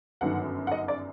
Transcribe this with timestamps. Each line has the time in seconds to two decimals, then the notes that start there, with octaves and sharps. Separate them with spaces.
0.21 G1 F#2 D#3 F#5
0.67 F#5
0.71 D#5
0.88 D5